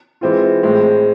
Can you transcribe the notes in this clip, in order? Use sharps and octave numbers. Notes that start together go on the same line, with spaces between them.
E3 G#3 C4 F4
A2 G#3 C4